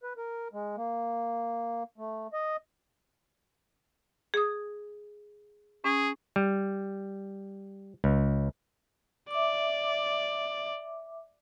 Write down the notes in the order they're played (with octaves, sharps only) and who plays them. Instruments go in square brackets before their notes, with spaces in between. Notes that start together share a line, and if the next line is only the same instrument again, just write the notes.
[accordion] B4
A#4
G#3
A#3
A3
D#5
[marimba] G#4 D#6
[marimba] C#4 [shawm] G#4
[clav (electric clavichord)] G3
C#2
[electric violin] D5 [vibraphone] E5 D6